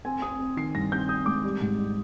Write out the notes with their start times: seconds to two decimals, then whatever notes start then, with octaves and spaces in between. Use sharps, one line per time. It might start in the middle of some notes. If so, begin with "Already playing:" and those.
0.05 C4 G#5
0.22 C4 D#6
0.39 C4
0.57 D#3 C7
0.75 G2 A#6
0.92 C4 G6
1.09 C4 D#6
1.26 G#3 D6
1.44 G3
1.61 G#2
1.78 G3